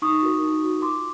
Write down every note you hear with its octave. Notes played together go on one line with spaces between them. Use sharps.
D#4 C#6 D#6
F#4 A#4
D#4
F#4 A#4
F4 C6 D6